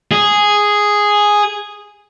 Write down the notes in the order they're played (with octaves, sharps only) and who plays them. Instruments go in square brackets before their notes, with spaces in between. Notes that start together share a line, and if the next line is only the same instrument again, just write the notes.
[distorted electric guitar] G#4